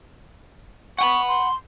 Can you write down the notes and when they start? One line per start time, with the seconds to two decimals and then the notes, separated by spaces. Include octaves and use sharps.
0.98 F#5 G5 B5 C#6
1.28 C6